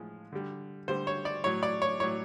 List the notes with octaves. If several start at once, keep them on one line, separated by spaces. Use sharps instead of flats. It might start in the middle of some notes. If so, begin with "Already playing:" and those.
Already playing: A2 F3 G#3
D3 G3
D3 G3 C5
C#5
D5
A2 F#3 C#5
D5
C#5
A2 F#3 C#5